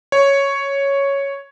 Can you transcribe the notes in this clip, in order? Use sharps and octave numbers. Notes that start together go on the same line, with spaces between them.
C#5